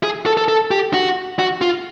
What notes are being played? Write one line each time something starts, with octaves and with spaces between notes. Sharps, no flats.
G#4
A4
A4
A4
G4
F#4
F#4
F4